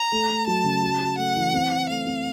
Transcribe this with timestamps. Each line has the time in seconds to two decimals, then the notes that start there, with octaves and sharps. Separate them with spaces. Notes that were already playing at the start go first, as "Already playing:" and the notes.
Already playing: A#5
0.12 A3
0.30 A3
0.47 F#3 A5
0.64 C#3
0.83 F#4
1.00 F#4
1.18 A3 F#5
1.36 E3
1.54 C4
1.72 E3
1.89 A3 F5
2.07 C4